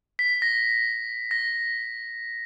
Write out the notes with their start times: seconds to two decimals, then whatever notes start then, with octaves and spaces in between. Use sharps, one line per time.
0.19 B6
0.42 A#6
1.31 A#6